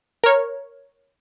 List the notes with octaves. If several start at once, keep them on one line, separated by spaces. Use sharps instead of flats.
A#4 C#5